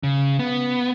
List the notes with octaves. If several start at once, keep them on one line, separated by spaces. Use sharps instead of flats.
C#3
B3